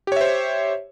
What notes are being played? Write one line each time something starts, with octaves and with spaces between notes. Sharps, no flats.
G4 C5 C#5 E5